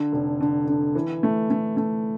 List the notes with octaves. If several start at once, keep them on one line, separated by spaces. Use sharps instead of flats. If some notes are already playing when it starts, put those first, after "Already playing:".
Already playing: D3
F1
D3
D3
E3
A3
A3
A3